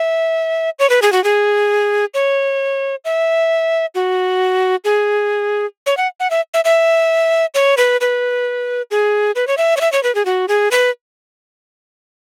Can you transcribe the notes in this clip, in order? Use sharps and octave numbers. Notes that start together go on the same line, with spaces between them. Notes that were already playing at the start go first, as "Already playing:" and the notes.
Already playing: E5
C#5
B4
G#4
F#4
G#4
C#5
E5
F#4
G#4
C#5
F#5
F#5
E5
E5
E5
C#5
B4
B4
G#4
B4
C#5
E5
C#5
E5
C#5
B4
G#4
F#4
G#4
B4